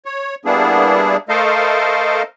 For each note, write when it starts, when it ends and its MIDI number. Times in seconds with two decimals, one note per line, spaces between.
0.05 0.35 73
0.45 1.17 55
0.45 1.17 58
0.45 1.17 59
0.45 1.17 62
0.45 1.17 64
0.45 1.17 68
1.29 2.23 57
1.29 2.23 69
1.29 2.23 70
1.29 2.23 72
1.29 2.23 75
1.29 2.23 77